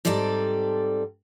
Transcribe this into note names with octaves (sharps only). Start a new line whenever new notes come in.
G#2 G3 C4 A4 D5 A#5